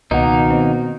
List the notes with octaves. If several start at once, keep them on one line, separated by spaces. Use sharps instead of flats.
C#2 B2 D#3 A#3 D#4 D#5 F#5
C4